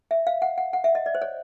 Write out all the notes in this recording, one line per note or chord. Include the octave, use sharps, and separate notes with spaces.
E5
F5
F#5
F#5
F#5
E5
D#5
D5
C5
C#5